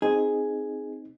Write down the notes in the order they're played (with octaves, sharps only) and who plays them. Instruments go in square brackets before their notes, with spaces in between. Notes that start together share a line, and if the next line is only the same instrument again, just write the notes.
[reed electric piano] C4 D#4 [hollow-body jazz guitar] G#4